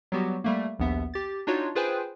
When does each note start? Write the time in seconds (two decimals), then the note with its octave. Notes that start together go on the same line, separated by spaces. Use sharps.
0.12 F#3 G3 B3 F#4 G4
0.44 G3 A3 A#3
0.79 A#1 D#2 B3 E5
1.14 G4 A6
1.47 D4 D#4 F4 F#4 C#5
1.75 F4 G#4 B4 C5 G5 G#5